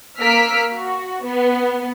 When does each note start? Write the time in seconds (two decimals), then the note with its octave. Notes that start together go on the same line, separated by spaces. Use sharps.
0.19 A#3 E6 F6 B6 D7
0.73 F#4
1.24 B3